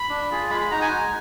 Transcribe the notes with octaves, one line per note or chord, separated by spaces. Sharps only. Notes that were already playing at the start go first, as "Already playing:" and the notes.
Already playing: B5
D4
F4 G#4
G#3 B5
B5
D#4 F#4 A#5
G#5
G#3